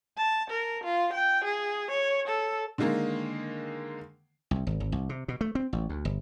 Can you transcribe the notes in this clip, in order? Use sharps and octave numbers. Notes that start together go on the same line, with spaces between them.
A5
A#4
F4
G5
G#4
C#5
A4
D3 D#3 G#3 A#3
C2
G#1
G#1
C2
C3
B2
A3
C4
A1
D2
G1